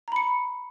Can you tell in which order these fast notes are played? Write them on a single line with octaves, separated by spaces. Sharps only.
A#5 B5 C#7